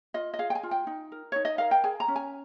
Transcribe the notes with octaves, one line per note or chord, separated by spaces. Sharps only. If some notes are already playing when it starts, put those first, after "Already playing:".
F4 D#5
D#5
G#4 F5
G5
G#5
F4
G5
D#4
A#4
D#4 C#5
D#5
A#4 F5
G5
G#4 G#5
A#5
C#4
G#5